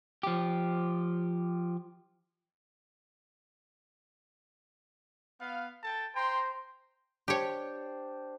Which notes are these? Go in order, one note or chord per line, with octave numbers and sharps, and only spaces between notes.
F3 G4
B3 F5
A4 G5 A5
C5 G5 A#5 C6
D4 G4 C5 C#5 G5